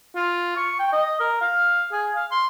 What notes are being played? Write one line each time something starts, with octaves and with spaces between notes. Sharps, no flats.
F4
C#6
G5
D#5
A#4
F5
G#4
F5
C6